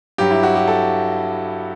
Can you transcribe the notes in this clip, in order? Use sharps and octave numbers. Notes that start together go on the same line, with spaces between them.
G2 F#3 G4
E4
F#4
G4
A4